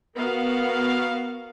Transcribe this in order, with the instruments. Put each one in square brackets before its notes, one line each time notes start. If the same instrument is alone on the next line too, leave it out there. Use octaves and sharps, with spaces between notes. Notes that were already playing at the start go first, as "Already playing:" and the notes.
[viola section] B3 F#4 A#4 F5